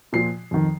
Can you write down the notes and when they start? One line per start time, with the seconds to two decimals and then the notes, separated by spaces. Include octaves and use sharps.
0.13 A#2 F3 C7
0.51 F2 D#3